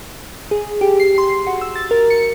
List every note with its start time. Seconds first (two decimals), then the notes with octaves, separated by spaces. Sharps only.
0.51 G#4
0.81 G4
1.00 C7
1.18 C6
1.47 F#4
1.61 E6
1.76 A6
1.91 A#4
2.10 C#7